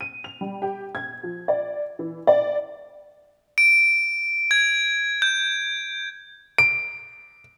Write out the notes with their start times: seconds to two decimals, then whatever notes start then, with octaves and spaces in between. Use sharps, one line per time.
0.01 D#7
0.24 F7
0.41 G3
0.62 G4
0.95 G#6
1.23 F3
1.48 D5
1.99 E3
2.27 D5
3.58 D7
4.51 G#6
5.22 G6
6.58 D7